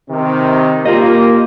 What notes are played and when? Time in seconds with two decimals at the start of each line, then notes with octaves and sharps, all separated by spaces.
0.10 C3 D#3 C4
0.85 A#3 F4 G4 D#5